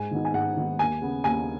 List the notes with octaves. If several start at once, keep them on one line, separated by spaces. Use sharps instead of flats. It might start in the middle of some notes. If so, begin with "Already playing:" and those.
Already playing: G#2 G#5
D#3 B3 D#4
G#5
G#2 F#5
D#3 B3 D#4
D#2 G#5
C#3 B3
D#2 G#5